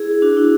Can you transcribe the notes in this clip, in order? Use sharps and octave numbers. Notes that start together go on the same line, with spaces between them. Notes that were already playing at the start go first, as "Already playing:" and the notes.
Already playing: E4 G#4
D4 F#4
E4